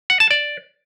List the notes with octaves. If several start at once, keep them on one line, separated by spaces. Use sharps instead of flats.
F#5
A5
D5